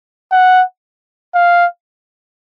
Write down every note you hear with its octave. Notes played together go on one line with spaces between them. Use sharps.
F#5
F5